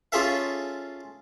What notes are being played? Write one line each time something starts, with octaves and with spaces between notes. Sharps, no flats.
C#4 F4 G#4 A4 E5 F5